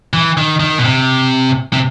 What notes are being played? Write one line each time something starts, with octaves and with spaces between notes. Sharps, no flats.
E3
D#3
D#3
B2
C3
C3